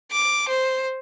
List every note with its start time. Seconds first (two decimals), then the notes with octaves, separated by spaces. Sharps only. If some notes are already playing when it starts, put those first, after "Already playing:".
0.11 D6
0.48 C5